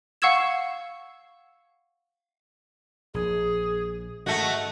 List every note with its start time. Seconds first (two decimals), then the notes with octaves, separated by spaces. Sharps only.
0.22 F5 F#5 C#6 E6 G#6 E7
3.14 A#1 G#4
4.26 G#2 D#3 A3 F#4 D#5